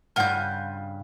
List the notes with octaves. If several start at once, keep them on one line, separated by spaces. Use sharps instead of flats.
G2 C#3 F4 F#5 G6